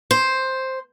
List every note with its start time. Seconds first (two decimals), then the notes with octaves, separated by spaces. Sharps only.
0.11 C5